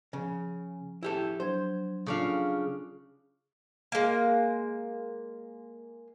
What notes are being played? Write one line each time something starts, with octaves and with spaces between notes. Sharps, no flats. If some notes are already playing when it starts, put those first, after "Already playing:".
C#3 F3
E4 G4 A4
F#3 D4 C5 G#6
C#3 D4 F4 A4 F5
G#3 A#3